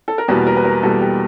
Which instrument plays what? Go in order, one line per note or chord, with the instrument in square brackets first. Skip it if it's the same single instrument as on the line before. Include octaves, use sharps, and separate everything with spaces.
[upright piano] A4
A#4
E2 B2 G3 A#3 B4
A#4
B4
A#4
E2 B2 G3 A#3 A4
G4